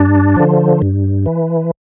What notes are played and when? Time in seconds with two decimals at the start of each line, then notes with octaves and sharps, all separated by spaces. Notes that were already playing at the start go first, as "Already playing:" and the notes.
Already playing: G2 D4
0.36 D3 F3
0.82 G2
1.26 E3